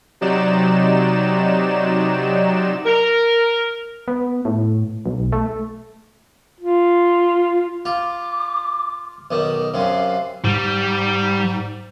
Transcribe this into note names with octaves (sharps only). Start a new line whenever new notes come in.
C3 F#3 D#4 D5 E7
A#4
B3
A2
B1
A3
F4
F4 D6
B1 D#3 D6
F#2 C3 F5
G#2 G3